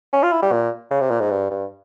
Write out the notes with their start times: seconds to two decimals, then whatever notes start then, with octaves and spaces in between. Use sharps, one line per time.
0.13 C#4
0.23 F4
0.32 E4
0.42 G3
0.52 A#2
0.91 C#3
1.01 C3
1.11 A#2
1.20 G#2
1.31 G2
1.50 G2